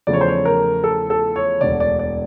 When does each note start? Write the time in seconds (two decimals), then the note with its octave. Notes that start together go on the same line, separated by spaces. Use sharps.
0.07 E2 C#3 F3 A3 D5
0.13 C#5
0.21 C5
0.28 C#5
0.45 A#4
0.84 A4
1.10 A4
1.36 C#5
1.60 E1 D2 D3 D5
1.80 D5
1.99 D5